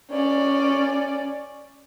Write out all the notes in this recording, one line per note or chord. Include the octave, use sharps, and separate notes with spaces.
C#4 D5